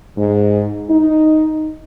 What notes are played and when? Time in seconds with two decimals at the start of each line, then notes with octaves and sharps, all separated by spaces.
0.18 G#2
0.90 D#4